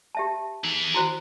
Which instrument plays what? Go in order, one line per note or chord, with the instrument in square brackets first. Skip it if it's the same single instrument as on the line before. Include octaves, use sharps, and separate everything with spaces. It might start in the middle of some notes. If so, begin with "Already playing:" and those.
[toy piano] G4 E5 A5
[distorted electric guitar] E3 G#4 [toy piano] D#4
[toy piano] E4 F#4 C5